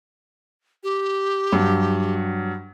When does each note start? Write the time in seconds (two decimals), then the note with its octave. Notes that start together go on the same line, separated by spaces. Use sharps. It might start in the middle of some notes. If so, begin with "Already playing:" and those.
0.84 G4
1.52 G2 F#3